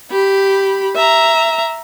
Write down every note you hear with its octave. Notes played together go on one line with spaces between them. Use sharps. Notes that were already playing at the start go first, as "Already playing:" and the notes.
G4 B5
E5 A#5